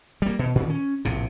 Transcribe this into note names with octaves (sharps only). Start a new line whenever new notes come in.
G3 A#3
B2
A#2 D3 D#3
C#4
A#1 A2 C3